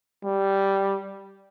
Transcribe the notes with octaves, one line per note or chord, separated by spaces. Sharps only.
G3